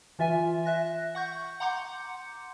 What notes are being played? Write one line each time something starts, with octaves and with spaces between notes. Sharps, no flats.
E3 F4 E5 G#5
E5 F#6 A#6
F#5 C#6 G6
F#5 A#5 C6 D6 G6 C#7